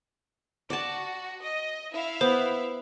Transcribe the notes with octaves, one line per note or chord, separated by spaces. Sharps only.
F#4 D5 A5
D#5
E4 E5 F5
B3 C5